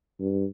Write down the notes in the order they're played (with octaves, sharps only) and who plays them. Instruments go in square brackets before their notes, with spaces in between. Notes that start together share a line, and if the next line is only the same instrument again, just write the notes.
[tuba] G2